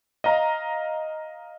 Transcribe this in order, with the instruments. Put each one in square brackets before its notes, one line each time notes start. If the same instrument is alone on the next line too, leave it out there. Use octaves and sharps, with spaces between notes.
[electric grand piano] D#5 F5 A#5